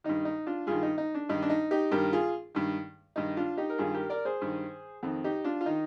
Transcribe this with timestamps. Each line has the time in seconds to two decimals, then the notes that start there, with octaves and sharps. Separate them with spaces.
0.04 G2 D#3 D#4
0.25 D#4
0.46 D4 F4
0.67 G2 D#3 F4 G#4
0.83 D#4
0.98 D#4
1.15 D4
1.29 G2 D#3 D#4
1.42 D4
1.50 D#4
1.71 D#4 G4
1.91 G2 D#3 G4 A#4
2.13 F4 G#4
2.55 G2 D#3
3.16 G2 D#3 D#4
3.37 D4 F4
3.57 D#4 G4
3.70 A#4
3.78 G2 D#3 F4 G#4
3.94 G4 A#4
4.10 A#4 D5
4.25 G#4 C5
4.41 G2 D#3
5.03 F2 D#3
5.24 D#4 G4
5.44 D4 F4
5.61 F4
5.66 D#3 D#4